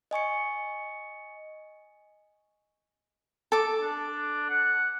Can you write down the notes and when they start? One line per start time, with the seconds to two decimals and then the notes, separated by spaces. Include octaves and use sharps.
0.11 D#5 G#5 C#6 C#7
3.52 A4 D6
3.81 D4
4.49 F#5